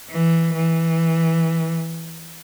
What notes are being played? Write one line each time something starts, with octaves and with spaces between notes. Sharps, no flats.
E3
E3